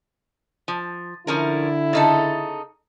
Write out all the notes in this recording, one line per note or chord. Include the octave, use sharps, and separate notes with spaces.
F3
D3 F3 C#4 E4 A#4
C#3 D#4 A4